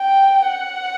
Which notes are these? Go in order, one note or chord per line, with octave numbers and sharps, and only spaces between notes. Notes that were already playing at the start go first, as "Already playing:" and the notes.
Already playing: G5
F#5